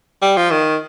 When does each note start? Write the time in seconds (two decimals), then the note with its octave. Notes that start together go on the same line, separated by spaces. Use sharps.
0.22 G3
0.37 F3
0.51 D#3